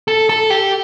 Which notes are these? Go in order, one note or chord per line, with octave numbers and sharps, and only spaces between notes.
A4
A4
G4